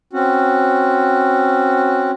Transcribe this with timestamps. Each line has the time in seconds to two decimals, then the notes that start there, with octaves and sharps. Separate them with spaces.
0.13 C4 C#4 F#4